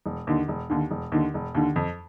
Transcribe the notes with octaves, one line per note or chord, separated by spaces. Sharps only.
E1
D#2 D3
E1
D#2 D3
E1
D#2 D3
E1
D#2 D3
F2